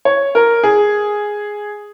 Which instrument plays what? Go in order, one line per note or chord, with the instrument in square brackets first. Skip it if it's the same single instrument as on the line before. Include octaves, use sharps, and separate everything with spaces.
[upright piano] C#5
A#4
G#4